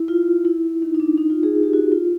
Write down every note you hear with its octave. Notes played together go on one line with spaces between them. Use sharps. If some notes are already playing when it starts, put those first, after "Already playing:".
Already playing: E4
F4
E4
D#4
D#4
D4
D#4
F4
G#4
G4
F#4
F4